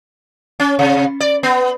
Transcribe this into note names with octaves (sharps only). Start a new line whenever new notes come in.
C#4
C3
D5
B3